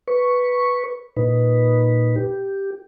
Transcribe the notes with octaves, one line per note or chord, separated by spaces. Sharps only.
B4 C#6
A#2 D#4 B4
G4